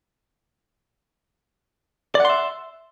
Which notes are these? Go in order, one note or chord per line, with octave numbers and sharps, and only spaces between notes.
D5 E5 F#5 C6